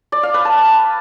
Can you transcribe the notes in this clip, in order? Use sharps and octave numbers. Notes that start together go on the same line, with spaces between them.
D5
F5
B4
A5